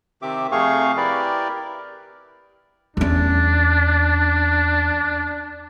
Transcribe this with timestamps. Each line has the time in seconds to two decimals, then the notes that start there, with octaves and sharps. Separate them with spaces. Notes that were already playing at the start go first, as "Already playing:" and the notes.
0.22 C3 D#3 C4 G4 E5 D6
0.52 F2 C3 A3 G#4 F5 C#6
0.97 E4 G4 A#4 B4 D5
2.97 E2 C#4 D4